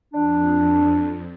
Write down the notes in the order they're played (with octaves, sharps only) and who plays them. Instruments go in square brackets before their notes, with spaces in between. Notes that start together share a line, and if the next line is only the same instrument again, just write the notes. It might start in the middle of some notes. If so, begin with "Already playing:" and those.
[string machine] F2 [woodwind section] D4